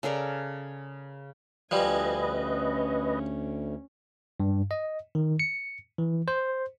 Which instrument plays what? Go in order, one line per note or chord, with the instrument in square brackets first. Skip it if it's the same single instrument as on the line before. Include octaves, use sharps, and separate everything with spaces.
[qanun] C#3 A4 A#4 D5
[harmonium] D2 [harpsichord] F3 G3 [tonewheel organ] B4 D#5 [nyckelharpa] G#5
[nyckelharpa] C#4
[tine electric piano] G2
D#5
D#3
C#7
E3
C5